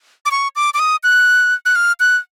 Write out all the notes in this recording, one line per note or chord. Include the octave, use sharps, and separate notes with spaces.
D6
C#6
D6
D6
D#6
F#6
F#6
F6
F#6